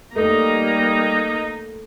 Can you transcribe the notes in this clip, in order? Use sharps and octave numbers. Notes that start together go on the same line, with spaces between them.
G3 A3 A#3 D#4 A#5